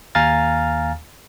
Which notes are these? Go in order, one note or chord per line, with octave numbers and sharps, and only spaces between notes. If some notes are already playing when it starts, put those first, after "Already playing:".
D#2 F5 G#5 A#5 F6 A6